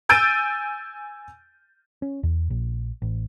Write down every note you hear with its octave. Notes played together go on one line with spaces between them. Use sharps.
G#5 E6 G6 A6 D7 D#7
C#4
E2
A#1
A1